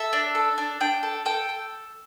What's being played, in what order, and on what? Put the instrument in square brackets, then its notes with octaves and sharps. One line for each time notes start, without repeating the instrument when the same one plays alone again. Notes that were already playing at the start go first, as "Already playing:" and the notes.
Already playing: [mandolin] A4 E5
D4
A4
D4
D4 G5
A4
A4 G5
A4